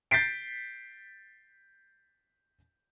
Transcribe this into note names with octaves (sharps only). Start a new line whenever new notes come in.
G6 A6 B6 C7 D7